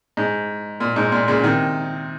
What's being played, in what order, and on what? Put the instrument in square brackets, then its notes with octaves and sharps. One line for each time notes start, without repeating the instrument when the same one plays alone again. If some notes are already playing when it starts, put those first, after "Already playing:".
[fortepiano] G#2
A#2
G#2
A#2
A#2 C#3
C3 D#3